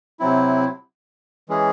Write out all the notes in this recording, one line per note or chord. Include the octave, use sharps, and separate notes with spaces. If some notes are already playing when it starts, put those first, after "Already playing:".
C3 F#3 C4 E4
E3 G#3 C#4 G#4